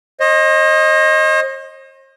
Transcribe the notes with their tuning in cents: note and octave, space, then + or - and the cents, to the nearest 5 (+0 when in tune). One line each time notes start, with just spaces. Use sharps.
C5 +45 D#5 +0